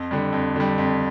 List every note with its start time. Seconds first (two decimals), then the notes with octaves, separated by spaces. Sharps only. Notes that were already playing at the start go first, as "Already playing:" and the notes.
Already playing: F2
0.11 D3 G3
0.33 F2
0.56 D3 G3
0.78 F2